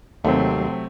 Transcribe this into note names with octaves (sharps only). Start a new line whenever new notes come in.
D#2 C3 F#3 A3 C4